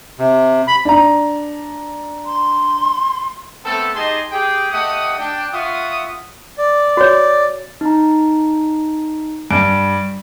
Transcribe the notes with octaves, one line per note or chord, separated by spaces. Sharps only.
C3
B5
D4 A#5
C6
A3 B3 C4 A4
D#4 G4 G#4 D#5 A5 C6
G4 G#4 G5
A3 G4 D#5 F#5 D#6
D4 G5
F4 E5 F#5 C#6 D#6
D5
F#4 C#5
D#4 A#5
G2 D7